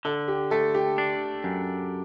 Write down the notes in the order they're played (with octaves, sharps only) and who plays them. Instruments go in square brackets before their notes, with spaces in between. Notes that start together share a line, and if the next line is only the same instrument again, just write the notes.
[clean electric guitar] D3 [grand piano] A4
[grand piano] G4
[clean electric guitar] A3 [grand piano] A4
[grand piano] G4
[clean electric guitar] D4
F#2